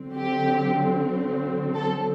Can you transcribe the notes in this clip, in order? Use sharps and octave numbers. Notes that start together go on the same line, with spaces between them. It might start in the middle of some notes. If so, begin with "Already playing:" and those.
Already playing: D3 F#3 C4
G4
A4